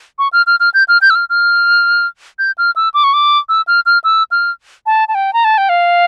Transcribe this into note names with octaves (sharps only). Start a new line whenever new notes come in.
C#6
F6
F6
F6
G6
F6
G6
E6
F6
F6
G6
F6
E6
D6
C#6
D6
E6
F6
F6
E6
F6
A5
A5
G5
A#5
A5
G5
F5